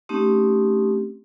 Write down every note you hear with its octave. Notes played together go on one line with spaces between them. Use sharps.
A3 C4 C#4 D#4 G4